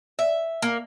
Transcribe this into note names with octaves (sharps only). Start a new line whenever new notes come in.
E5
A#3